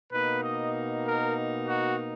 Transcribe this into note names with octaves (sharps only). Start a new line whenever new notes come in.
B2 A#3 D#4 B4
D#5
A#4
F#4